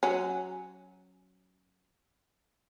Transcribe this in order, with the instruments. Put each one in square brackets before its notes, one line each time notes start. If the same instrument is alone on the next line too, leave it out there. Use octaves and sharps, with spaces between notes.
[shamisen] F#3 C#4